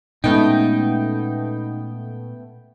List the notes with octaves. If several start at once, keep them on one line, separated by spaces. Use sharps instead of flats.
A#2 G#3 A3 B3 C#4 D#4 G5